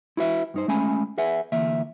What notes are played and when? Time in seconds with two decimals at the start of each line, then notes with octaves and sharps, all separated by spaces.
0.17 E4 F#4 B4 E5
0.54 G2 D#4 C5
0.68 G#3 A3 C#4 G#5 B5
1.18 G#4 B4 E5 F#5 G#5
1.52 D2 E3 A#3 E5